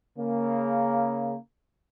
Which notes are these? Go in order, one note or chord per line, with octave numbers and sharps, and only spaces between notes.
C#3 A#3